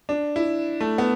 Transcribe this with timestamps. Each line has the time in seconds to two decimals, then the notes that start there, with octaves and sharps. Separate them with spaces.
0.09 D4
0.36 E4
0.80 A3
0.98 B3